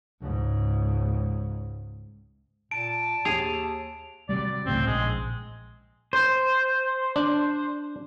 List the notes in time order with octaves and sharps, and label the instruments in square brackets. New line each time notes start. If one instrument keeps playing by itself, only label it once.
[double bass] C#2 G#2
[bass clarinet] A#2 [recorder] A5 [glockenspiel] D7
[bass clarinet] D#2 [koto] G#4 [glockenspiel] F7
[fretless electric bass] C3 F#3 G3 [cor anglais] D5
[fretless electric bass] C#2 A2 C#3 [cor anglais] C4
[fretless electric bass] A#1 [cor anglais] G#3
[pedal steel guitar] C5
[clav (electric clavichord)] D4